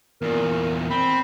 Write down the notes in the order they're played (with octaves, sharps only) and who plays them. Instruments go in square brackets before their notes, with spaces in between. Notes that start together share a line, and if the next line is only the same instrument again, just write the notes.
[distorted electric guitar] E2 A#2 [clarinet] A#4
[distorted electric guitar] C4 [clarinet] B5